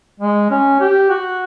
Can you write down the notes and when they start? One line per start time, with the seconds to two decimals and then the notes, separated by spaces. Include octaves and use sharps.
0.20 G#3
0.50 C#4
0.80 G4
1.10 F#4